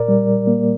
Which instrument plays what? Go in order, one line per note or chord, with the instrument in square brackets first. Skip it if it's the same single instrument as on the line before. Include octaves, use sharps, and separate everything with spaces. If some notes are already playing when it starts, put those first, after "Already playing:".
Already playing: [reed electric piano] A#2 A#4 D5
G3
A#3